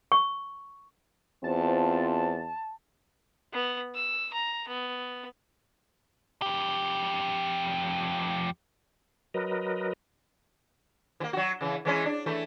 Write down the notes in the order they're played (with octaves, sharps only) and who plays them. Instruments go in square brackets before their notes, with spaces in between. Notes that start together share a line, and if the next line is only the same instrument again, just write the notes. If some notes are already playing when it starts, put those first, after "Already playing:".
[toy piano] C#6
[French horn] E2 [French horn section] C4 F4 C5 [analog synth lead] A5
[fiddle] B3
E6
A#5
B3
[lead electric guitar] F2 G4
[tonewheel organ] F#3 A#4 B4 D#5
[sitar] E3 A#3
F#3 F#4
C#3 E3
E3 G#3 C#4
D4
E3 A3